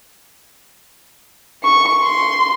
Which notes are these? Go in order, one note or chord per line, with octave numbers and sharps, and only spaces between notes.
C#6
C6